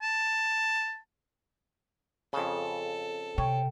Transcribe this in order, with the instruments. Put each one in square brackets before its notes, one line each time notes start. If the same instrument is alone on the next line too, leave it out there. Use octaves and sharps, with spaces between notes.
[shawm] A5
[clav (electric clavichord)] F2 C#3 [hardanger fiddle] A4
[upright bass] C3 [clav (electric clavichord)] C#5 [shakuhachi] G5